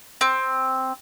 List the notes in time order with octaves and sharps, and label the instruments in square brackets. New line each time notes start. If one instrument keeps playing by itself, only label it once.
[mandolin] C4